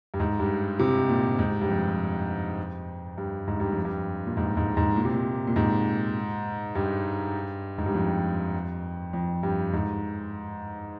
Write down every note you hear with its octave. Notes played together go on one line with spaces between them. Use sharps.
G2
G#2
G2
C3
A#2
G#2
G2
F2
G2
G#2
G2
F2
G2
A#2
G#2
G#2
G#2
A#2
C3
A#2
A#2
G#2
G2
G#2
G2
F2
F2
G2
G#2